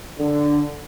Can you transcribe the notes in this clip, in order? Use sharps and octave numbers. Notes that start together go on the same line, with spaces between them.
D3